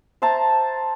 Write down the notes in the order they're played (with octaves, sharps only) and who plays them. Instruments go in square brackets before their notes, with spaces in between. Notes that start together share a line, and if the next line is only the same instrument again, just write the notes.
[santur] C5 E5 A5 A#5